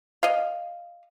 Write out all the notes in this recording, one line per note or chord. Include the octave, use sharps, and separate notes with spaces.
D#5 F5